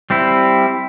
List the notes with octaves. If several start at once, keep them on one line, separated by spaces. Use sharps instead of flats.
G3 C4 E4